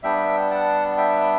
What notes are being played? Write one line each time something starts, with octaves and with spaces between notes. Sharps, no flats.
G3 B3 D4 E5 G5
F#5 A5
E5 G5